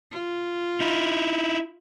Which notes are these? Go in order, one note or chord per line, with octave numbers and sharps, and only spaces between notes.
F4
D#4 E4